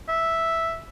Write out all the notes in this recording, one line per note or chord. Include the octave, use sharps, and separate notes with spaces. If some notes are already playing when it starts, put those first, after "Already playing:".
E5